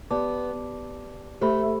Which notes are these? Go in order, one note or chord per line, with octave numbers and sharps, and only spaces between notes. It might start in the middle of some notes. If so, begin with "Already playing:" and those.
B3 G4 D5 A5 D6
A3 G4 C5 E5 B5